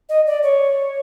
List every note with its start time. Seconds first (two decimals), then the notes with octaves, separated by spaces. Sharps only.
0.09 D#5
0.27 D5
0.43 C#5